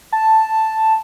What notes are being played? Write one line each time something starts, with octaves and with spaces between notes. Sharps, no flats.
A5